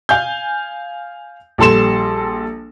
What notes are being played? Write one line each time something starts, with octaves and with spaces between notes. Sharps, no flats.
F5 G#5 G6
A#1 G3 A4 C6 E7